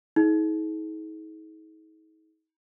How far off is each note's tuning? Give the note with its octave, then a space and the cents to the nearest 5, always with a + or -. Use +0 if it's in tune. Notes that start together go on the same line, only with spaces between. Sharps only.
D#4 +40 G#4 +40